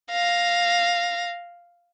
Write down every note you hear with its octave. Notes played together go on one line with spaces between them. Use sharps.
F5 A#6